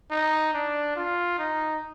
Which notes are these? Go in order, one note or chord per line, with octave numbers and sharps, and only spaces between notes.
D#4
D4
F4
D#4